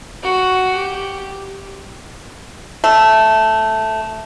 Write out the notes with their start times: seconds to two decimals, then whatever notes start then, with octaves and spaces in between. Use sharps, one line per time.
0.23 F#4
0.76 G4
2.84 A3